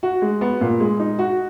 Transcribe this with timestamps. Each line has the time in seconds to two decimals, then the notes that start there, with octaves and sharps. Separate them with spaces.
0.03 F#4
0.22 G#3
0.41 B3
0.61 A#2
0.80 G#3
0.99 D#4
1.19 F#4